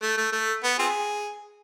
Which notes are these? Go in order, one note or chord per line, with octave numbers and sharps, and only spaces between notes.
A3
A3
A3
B3
C4 F4 G#4